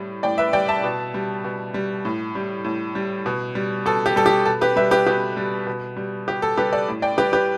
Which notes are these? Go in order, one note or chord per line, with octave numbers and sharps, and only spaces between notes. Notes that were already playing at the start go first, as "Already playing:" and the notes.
Already playing: A2 G3
A2 D5 G5
B4 E5
G3 D5 G5
E5 A5
B2
G3
B2
G3
A2
G3
A2
G3
B2
G3
B2 A4
G4
G3 A4
G4
B2 A4
G4 B4
G3 B4 E5
G4 B4
B2 G4
G3
B2
G3
B2 G4
A4
G3 G4 B4
A4 D5
A2
D5 G5
G3 G4 B4
G4 B4